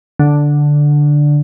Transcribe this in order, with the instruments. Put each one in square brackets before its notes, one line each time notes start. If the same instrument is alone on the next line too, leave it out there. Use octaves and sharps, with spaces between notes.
[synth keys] D3